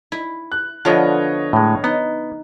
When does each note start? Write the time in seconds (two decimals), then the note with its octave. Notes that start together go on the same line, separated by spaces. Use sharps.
0.12 E4
0.52 F#6
0.85 D3 F3 B3 F4 C#5 D#5
1.53 A2 G#3
1.84 B3 D#4